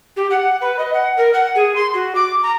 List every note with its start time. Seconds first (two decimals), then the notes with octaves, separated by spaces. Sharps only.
0.16 G4
0.30 F#5
0.61 B4
0.78 D#5
0.93 F#5
1.16 A#4
1.33 F#5
1.55 G#4
1.75 C6
1.93 F#4
2.15 D6
2.42 A#5